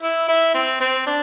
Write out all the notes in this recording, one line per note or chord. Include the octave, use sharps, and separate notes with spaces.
E4
E4
C4
C4
D4